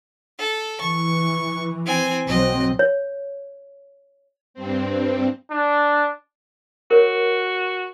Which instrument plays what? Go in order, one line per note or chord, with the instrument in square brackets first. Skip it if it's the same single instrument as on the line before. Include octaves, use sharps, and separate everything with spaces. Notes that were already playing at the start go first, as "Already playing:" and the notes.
[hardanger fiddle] A4
[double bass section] E3 [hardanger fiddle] C#6
[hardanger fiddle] C4 G#5
[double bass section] B1 F#3 C4 [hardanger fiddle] D#5
[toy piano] C#5
[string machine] G2 C4
[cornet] D4
[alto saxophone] F#4 [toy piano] A#4 C#5